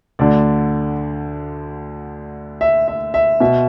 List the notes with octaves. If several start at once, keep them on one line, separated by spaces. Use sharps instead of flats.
D2 D3 D5
E5
E5
E5
B2 E5